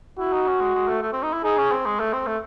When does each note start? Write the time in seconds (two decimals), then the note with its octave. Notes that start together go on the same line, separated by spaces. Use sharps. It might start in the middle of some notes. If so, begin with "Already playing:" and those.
0.19 E4 F#4
0.33 D#4
0.47 C#4
0.61 G#3
0.75 G#3
0.88 A3
1.02 A3
1.13 C4
1.23 D#4
1.33 E4
1.44 D#4 G#4
1.58 C#4
1.72 C4
1.85 G#3
1.99 A3
2.13 C4
2.27 A3